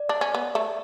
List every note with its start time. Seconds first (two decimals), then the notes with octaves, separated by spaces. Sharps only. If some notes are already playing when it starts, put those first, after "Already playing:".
Already playing: D5
0.09 D4
0.21 C#4
0.34 B3
0.55 A3